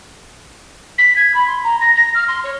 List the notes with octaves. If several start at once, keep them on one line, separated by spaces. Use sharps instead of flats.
B6
G#6
B5
C6
A#5
A#6
A#6
F6
C6
C#5